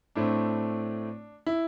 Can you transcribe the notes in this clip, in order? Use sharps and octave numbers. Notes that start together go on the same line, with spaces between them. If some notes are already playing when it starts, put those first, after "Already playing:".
A2 A3 C4 D4
E4